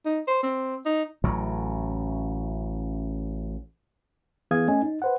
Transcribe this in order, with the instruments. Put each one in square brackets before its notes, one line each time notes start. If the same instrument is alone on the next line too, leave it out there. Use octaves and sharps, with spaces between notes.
[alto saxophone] D#4
C5
C4
D#4
[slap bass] A1 A2 C#3 F#3
[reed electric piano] E3 B3 G#4 F5 D#6 G#6
A3 C#4 D#5 G#5
D#4
B4 C5 F#5